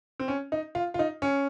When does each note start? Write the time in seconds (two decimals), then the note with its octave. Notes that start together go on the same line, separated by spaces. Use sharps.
0.20 C4
0.28 C#4
0.52 D#4
0.75 F4
0.94 F4
0.99 D#4
1.22 C#4